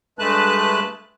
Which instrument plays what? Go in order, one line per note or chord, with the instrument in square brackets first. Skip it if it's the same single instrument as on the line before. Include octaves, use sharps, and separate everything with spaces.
[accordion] G2 G#3 A3 B4 A5 F#6